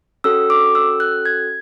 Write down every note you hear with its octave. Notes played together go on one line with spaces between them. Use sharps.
C#4 F#4 A4 E6
D6
E6
F#6
G#6